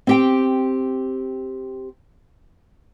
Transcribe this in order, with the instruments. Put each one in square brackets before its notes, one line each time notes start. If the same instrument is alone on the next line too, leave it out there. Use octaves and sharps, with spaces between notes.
[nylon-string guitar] C4 G4 G5